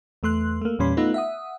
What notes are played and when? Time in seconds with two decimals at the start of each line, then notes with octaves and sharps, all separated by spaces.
0.23 E2 A3 C6 F#6
0.61 A3 A#3
0.79 E2 A#2 G3 C#4 B5 C6
0.97 A3 B3 D#4 F4 B4
1.14 E5 F#5 D#6